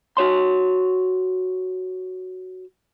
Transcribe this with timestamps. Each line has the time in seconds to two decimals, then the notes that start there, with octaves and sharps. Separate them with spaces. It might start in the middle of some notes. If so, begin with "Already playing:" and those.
0.17 F#4 C#5 C6